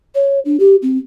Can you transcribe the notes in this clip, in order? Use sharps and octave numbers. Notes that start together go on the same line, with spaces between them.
C#5
D4
G4
C4